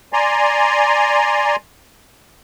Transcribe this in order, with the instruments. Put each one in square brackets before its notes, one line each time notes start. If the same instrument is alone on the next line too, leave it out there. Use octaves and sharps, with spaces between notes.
[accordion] D5 G#5 A#5 C6